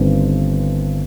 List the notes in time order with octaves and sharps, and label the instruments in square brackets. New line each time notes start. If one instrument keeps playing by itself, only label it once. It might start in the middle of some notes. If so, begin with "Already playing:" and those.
Already playing: [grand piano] G1 G2 D#3 C4